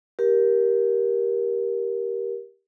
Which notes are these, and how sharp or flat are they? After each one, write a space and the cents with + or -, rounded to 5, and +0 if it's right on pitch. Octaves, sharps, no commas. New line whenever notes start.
G4 +0 A#4 +15